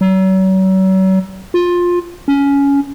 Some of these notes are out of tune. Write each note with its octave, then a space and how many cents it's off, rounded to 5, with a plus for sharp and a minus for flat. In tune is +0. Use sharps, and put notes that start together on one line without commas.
F#3 +40
F4 +15
C#4 +15